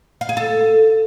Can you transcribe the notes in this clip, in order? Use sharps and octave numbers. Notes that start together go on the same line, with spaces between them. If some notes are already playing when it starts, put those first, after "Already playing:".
F5
G#4
A4